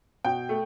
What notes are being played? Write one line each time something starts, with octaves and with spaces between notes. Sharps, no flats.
B2 G5
A3